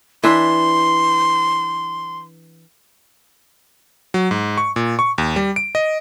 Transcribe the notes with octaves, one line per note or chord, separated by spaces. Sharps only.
E3 D4 E5 C6
F#3
G#2
C#6
A#2
C#6
D#2
G3
D7
D#5